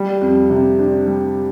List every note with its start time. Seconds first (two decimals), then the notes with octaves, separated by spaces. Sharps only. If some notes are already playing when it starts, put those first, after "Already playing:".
Already playing: G3
0.21 F2
0.50 C3
0.79 D4
1.07 G3